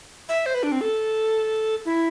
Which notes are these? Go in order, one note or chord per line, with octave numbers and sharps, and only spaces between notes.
E5
C5
B4
D4
C4
A4
E4